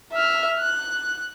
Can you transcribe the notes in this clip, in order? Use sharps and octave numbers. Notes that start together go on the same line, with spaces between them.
E5 F6
F#6